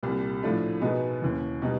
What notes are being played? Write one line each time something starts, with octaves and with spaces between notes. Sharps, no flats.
C2 A#2 G3
A2 F3 A3 D4 F4
B2 G#3 B3 D#4 F#4
D#2 C#3 E3
B2 G3 B3 D#4